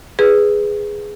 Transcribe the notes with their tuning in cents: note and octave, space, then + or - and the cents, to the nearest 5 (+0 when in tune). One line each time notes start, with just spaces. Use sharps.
G#4 +0 B4 +0